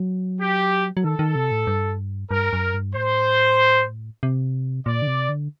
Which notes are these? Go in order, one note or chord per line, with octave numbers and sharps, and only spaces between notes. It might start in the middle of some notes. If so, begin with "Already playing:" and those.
Already playing: F#3
G4
F#3
D#3 A4
D#3
C3
A2
G2
G2 A#4
F#2
G2
A2 C5
C3
A#2 D5
D3
C3
D3